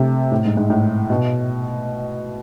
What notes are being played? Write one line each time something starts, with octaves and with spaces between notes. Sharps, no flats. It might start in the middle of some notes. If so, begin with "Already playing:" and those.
Already playing: C3 A3
A2
G#2
G#2
A2
B2